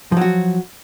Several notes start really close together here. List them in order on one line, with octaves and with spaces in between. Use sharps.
F3 F#3 F#4